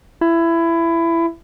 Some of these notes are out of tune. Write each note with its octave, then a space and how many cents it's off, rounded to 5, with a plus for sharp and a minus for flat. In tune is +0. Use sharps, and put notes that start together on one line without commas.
E4 +20